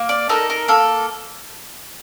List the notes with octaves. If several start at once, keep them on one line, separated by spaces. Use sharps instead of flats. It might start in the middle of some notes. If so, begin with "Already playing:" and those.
Already playing: A#3
D5
D#4 A4 A#4
A#4
A#3 A4